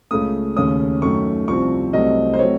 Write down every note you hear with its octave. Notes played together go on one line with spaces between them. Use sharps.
C#2 C#3 A3 D#6
D#2 C#3 A3 C#4 D#6
F#2 D#3 A3 C#4 C#6
C2 C3 F3 C4 C#6
C2 C3 F#3 A3 C4 D#5
C5
F#3 A3 C4 C#5